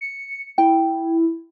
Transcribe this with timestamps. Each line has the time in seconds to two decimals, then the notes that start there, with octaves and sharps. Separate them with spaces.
0.01 C#7
0.58 E4 G5